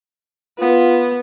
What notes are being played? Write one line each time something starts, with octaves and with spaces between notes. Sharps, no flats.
B3 F4